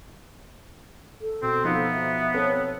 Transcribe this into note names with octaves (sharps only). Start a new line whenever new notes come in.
A4
B2 C4
F3 B3 D#4 F4
E5
C4 A4 B4 C#5